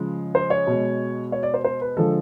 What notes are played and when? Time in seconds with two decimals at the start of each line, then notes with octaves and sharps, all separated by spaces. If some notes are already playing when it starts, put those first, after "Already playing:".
Already playing: C#3 F3 G#3
0.35 C5
0.50 C#5
0.67 B2 G#3
1.32 C#5
1.43 D5
1.54 C5
1.64 C5
1.81 B4
1.97 D3 F3 G#3 A4